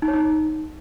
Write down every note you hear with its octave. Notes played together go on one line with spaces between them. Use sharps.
D#4
C#5
D#4